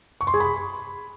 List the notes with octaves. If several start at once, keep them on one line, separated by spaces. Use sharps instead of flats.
C#6
C6
G#4
B5